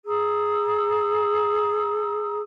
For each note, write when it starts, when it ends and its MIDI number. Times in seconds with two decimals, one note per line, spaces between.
0.06 2.41 68
0.06 2.41 82
0.06 2.41 87
0.06 2.41 88